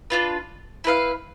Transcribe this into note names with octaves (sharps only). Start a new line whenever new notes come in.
D4 F4 B4
E4 B4 F5